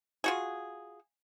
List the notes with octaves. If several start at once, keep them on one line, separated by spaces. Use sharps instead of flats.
F4 F#4 G#4